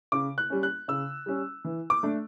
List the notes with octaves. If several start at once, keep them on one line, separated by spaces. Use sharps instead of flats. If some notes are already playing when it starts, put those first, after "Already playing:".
C#3 D6
F#6
G3 C#4
F#6
C#3 E6
G3 C#4
E3
D6
A3 D4